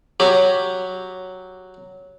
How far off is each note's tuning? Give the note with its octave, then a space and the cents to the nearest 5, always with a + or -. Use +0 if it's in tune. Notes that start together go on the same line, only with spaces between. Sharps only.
F#3 +0 G4 +10